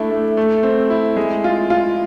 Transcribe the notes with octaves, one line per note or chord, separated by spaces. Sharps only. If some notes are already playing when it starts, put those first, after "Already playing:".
Already playing: A3 D4 E4
A3
A3
C4
E4
G#3
F4
F4